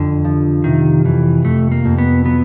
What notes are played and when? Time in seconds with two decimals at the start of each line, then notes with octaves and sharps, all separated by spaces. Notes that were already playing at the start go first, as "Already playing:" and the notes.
Already playing: F2 D3
0.24 F3
0.64 C3 D#3
1.04 F2 E3
1.45 F2 A3
1.72 A#3
1.85 F2
1.98 B3
2.25 F#3 B3